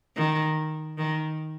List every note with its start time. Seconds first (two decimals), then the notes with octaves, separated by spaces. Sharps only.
0.17 D#3
0.98 D#3